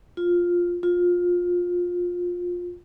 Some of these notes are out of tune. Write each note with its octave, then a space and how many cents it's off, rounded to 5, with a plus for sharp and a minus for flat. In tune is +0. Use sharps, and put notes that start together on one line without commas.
F4 +5
F4 +20